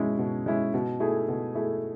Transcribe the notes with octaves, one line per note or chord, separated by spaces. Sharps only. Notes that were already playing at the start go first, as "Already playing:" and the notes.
Already playing: B2 G#3 C#4 E4
B2
G#3 C#4 E4
B2
A3 E4 G#4
B2
A3 E4 G#4